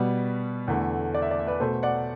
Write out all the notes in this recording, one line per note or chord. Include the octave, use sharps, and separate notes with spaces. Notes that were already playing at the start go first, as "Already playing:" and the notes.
Already playing: B2 G3 B3
E2 D3 A3
D5
E5
D5
E5
B4 D5
B2 A3 A4 C5
D5 F#5